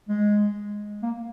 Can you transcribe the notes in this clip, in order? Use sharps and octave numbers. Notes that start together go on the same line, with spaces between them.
G#3
A#3